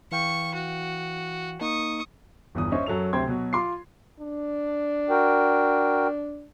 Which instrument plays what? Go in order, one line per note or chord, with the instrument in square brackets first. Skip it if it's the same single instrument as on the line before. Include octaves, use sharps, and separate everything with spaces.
[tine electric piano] E3 F5 G5 [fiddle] C#6
[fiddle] F#4
[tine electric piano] A#3 D#4 [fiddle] C#6 D#6
[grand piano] G1 E2 D#6
C#4 C5 C#5 D#5 E5
F#2 F#3 A4 F7
D2 C3 C5 G5 C6 G#6
B2 F#3
F4 C6 D6 C7
[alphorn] D4
[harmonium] F#4 A#4 G5